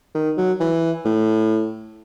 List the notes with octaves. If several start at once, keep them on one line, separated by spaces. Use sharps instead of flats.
D#3
F#3
E3
A2